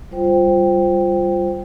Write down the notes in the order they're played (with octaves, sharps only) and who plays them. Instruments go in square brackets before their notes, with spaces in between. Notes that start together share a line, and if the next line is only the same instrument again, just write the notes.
[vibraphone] G3 F4 C5 G5